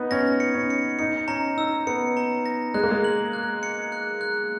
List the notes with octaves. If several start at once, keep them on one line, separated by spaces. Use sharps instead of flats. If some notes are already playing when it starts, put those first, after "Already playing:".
Already playing: B3 D#4
C#4 A#6
C#7
C#4
C#7
D#4 C#7
C#4 A#5
D#4 E6
B3 C#7
A#5
A#6
G#3 F#6
A#3
G#3
F#7
F#6
C#7
F#6
F#6